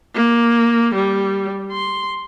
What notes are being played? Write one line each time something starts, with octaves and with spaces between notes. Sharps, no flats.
A#3
G3
C6